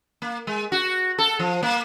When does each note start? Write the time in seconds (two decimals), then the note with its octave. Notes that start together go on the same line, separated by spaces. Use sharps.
0.22 A#3
0.47 G#3
0.72 F#4
1.18 A4
1.39 F3
1.63 A#3